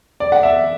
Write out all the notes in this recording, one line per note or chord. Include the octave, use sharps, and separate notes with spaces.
D5
F#5
E5